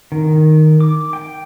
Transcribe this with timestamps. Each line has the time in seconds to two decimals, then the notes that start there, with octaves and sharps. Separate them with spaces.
0.12 D#3
0.81 D6
1.13 G5